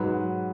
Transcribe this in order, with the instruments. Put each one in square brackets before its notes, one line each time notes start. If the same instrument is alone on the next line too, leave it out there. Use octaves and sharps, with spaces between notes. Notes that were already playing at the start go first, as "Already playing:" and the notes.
Already playing: [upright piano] G#2 F#3 B4